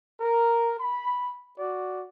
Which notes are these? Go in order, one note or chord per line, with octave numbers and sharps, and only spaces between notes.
A#4
B5
F#4 D5